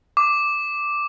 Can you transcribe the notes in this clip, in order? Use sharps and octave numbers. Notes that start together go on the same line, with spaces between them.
D6